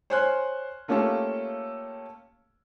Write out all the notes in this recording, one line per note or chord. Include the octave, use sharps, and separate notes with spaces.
C5 C#5 G#5 C6 F6 F#6
A3 A#3 C#4 F4 G4 A4